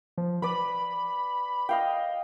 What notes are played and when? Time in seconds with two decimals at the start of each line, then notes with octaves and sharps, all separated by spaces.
0.18 F3
0.42 B4 D5 B5
1.69 D#5 F5 G5